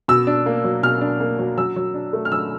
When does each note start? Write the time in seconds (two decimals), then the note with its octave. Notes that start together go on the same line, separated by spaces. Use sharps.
0.08 B2 E6
0.27 D4
0.46 A#3
0.64 F#3
0.83 B2 F6
1.01 D4
1.20 A#3
1.39 F#3
1.58 F#3 E6
1.76 F#3
1.94 D4
2.13 A3
2.25 F6
2.32 F#3 E6